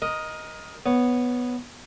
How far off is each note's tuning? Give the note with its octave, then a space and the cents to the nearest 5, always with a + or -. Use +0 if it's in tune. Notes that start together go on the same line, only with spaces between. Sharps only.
A#4 +20 D#5 +0
B3 +0 C#5 +0